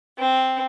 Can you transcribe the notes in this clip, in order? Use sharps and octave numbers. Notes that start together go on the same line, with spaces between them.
C4